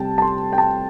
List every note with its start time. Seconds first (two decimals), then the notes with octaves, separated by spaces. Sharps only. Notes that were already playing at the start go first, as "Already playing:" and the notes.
Already playing: C3 G3 G5 A5
0.18 A5
0.22 C6
0.53 G5
0.58 A5